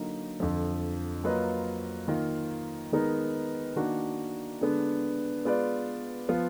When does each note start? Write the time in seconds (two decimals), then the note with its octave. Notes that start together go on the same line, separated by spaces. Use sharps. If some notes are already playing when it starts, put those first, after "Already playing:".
Already playing: D3 F#3 A#3 D#4
0.40 F2 D3 F3
1.24 F#3 A#3 F4 B4 D#5
2.08 D#3 A#3 F4 A#4
2.92 D#3 G#3 B3 D#4 A#4
3.76 D#3 A#3 D4 F#4
4.61 D3 G#3 B3 D4
5.45 G#3 B3 F4 B4 D5
6.29 F3 B3 F4